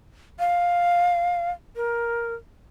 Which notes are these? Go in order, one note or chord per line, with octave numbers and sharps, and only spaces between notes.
F5
A#4